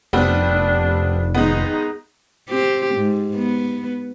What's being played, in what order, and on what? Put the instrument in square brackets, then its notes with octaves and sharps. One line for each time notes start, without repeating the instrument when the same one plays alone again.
[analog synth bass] F1 [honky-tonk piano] G3 B3 C4 [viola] D4
[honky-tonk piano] D#3 G#3 B3 [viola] D#4 A#5
[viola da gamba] C4 G4
G#2
B3